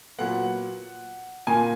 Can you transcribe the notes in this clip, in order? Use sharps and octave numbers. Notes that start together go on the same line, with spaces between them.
A#2 F#3 B3 F#5
A#2 A#3 G#5